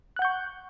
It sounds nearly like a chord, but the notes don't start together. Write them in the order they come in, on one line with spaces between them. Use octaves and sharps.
F#6 F#5 G6 C#6